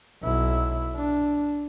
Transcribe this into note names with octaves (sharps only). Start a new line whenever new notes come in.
B1 E4
D4